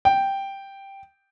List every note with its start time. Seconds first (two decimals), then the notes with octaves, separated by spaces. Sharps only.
0.05 G5